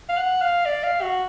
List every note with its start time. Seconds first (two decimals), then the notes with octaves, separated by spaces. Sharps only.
0.09 F5
0.17 F#5
0.42 F5
0.66 D5
0.84 F5
1.02 F#4